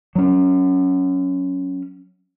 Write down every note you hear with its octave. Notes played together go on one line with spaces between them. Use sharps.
F#3 C#4